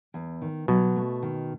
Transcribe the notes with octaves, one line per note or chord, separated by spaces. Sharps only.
E2
D#3
B2 F#3
A3
D#3